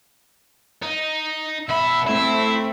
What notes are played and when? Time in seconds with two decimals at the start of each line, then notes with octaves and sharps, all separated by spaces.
0.82 D#4
1.69 B2 E5 B5
2.07 A3 C4 E4